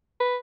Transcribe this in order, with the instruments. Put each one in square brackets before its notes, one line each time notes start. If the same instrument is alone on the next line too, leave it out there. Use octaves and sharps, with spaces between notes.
[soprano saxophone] B4